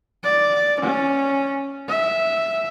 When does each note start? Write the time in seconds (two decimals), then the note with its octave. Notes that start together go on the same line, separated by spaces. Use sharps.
0.24 D5
0.81 C#4
1.89 E5